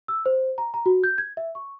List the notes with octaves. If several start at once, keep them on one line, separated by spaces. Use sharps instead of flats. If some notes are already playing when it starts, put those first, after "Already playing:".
E6
C5
A#5
A#5
F#4
G6
G#6
E5
C#6